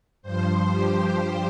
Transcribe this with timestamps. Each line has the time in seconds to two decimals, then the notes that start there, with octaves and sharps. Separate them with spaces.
0.22 G2 F3 C5
0.70 G4